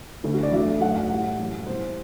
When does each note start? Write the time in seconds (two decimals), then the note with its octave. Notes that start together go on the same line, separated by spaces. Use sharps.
0.24 D2 D3 A3
0.34 F#4
0.43 D5
0.52 E2 D3 F#3 A3 E5
0.81 F#2 F#3 A3 F#5
0.95 F#5
1.10 A2 G3
1.39 F#2 E3 G3
1.66 C2 B2 G3 C5